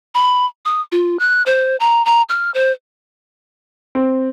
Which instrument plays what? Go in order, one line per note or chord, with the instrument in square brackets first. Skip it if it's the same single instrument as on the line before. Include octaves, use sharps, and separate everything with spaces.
[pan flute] B5
D#6
F4
F#6
C5
A#5
A#5
F6
C5
[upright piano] C4